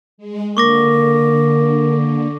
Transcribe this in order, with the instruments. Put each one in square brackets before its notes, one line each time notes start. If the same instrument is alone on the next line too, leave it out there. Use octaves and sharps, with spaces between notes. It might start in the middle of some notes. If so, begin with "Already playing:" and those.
[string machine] G#3
[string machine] D3 [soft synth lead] A#3 [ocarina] A#4 [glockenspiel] C#6 D6 A#6